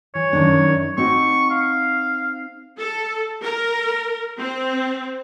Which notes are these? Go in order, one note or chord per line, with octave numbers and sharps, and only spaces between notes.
E3 C#5
F#2 D#3 D4
C4 D#4 F#4 C#6
F5
A4
A#4
C4